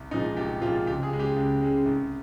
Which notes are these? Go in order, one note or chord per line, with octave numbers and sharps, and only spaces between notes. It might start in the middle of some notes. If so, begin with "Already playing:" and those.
Already playing: C2
A#2 F3 G#3 D#4
C2 G4
A#2 F3 G#3 F4
C#2 G4
G#4
C#3 G#3
G4
C#2
C#3 G#3
C2